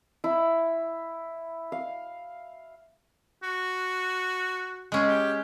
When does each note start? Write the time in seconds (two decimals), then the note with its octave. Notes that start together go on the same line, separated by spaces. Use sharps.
0.24 E4
1.72 F5
3.43 F#4
4.92 G#3 C#4 G#4
5.07 G4